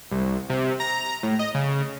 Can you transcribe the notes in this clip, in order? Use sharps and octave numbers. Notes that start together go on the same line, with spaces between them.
C2
C3
A#5
A2
D#5
C#3